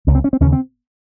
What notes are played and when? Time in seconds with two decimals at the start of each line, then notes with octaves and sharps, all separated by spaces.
0.07 C#2 C3
0.15 C4
0.24 C#4
0.33 C4
0.40 D#2 C#3 C#4
0.52 C4